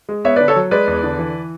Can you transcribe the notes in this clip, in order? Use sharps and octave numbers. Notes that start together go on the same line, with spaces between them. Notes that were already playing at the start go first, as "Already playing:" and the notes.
G#3
B3 C#5 E5
B4 D5
D3
A4 C#5
F#3
G#3 B4 D5
E2
D3
E3